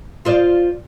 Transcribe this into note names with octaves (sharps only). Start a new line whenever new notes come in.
F4 C5 D5